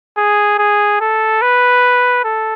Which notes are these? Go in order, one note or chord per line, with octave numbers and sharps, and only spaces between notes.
G#4
G#4
A4
B4
A4